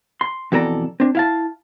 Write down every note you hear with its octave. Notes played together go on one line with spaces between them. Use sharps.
C6
F2 B2 E3 A4 D5 A#5
C4 D4
E4 F5 A5